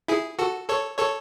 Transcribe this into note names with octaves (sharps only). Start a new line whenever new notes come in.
E4 G#4
F#4 A4
A4 C#5
A4 C#5